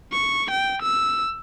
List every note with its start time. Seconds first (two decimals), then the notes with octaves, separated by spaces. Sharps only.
0.13 C#6
0.51 G5
0.82 E6